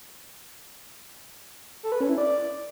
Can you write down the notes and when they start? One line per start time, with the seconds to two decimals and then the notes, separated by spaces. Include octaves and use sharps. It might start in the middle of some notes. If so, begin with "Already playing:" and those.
1.83 A4
1.92 B4
2.01 C#4
2.09 E4
2.18 D5